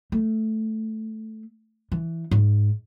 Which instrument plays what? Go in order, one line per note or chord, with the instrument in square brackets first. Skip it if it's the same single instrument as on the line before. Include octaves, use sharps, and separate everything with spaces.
[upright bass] A3
E3
G#2